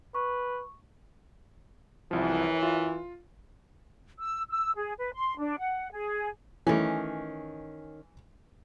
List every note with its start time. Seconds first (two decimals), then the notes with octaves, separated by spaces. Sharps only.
0.15 B4 C#6
2.11 C2 F#2 E3 F3
2.63 F4
4.19 E6
4.50 E6
4.75 G#4
4.98 B4
5.14 C6
5.38 D4
5.58 F#5
5.92 G#4
6.67 D#3 E3 A3 C#4